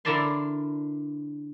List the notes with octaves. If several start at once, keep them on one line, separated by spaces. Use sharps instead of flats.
D3 E4 A#4 D5 A5 C6